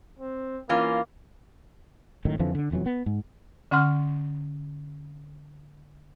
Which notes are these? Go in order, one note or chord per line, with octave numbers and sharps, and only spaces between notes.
C4
E3 A#3 C#4 F4
G#1 F#2 A2 D#3
F2 D3 E3 F3
D3 D4
E1 F2 E3 F#3
B3
G#2
D3 C#4 F#5 C6 F6